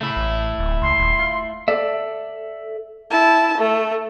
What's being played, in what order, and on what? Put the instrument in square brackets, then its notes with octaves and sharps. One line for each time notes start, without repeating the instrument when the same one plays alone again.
[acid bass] C#3 [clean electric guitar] A3 E4
[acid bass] A1
D1
[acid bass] C#2 [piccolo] C6
[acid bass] D#1
F4
[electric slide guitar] A4 D5 E5
[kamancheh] E4 A5
A3